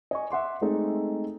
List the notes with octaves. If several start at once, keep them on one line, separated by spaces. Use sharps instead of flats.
D#5 G#5 C#6
E5 F#5 C6 D6
G#3 A3 C4 D#4 G#4 A4